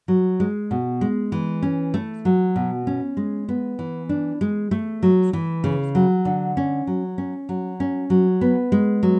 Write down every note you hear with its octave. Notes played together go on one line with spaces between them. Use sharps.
F#3
G#3
B2
G#3
E3
C#4
A3
F#3
B2
C#4
G#3
B3
E3
D4
G#3
A3
F#3
E3
C#3
F#3
D3
C#4
F#3
C#4
F#3
C#4
F#3
B3
G#3
F#3